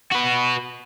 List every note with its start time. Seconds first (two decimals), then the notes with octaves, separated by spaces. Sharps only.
0.12 F#4 B4